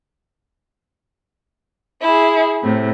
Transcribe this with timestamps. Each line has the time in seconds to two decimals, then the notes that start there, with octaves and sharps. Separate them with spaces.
2.02 E4 G#4
2.63 A2 C3